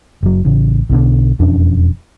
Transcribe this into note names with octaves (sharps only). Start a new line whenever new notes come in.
F#1 F#3
A1 C#3
B1 B2 D3
E1 F2 C#4 D4